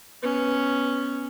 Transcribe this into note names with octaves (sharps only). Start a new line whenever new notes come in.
B3 C#4